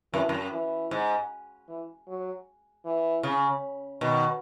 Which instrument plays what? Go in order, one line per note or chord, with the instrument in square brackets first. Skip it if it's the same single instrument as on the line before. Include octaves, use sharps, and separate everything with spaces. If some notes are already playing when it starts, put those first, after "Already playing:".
[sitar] F#2 [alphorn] E3
[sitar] F#2
[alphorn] E3
[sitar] G#2
[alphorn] E3
F#3
E3
[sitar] C#3
[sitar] B2 [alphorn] D#3